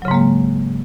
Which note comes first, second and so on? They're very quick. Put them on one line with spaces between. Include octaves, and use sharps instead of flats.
F#3 C#3 G#2 A#3 G#3